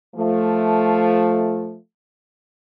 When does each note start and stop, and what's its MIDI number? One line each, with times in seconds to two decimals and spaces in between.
0.15 1.75 53
0.15 1.75 57